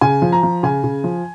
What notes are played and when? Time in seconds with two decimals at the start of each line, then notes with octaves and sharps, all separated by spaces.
0.01 C#3 G#5
0.22 F3
0.32 A#5
0.43 F3
0.63 C#3 G#5
0.84 C#3
1.04 F3